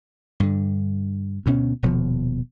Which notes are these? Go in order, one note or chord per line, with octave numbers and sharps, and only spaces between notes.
G2 D3
D2 B2 C#4
D#1 B2 F3